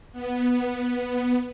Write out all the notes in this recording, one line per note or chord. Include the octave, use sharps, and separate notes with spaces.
B3